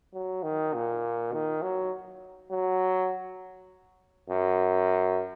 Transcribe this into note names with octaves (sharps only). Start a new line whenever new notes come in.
F#3
D#3
A#2
D#3
F#3
F#3
F#2